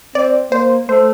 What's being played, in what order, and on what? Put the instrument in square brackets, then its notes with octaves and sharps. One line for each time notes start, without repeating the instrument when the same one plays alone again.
[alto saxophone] C4 [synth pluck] D5
[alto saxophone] A#3 [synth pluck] C5
[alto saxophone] A3 [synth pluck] C5